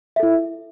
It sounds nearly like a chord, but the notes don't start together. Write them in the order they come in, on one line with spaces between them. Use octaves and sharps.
E5 A4 E4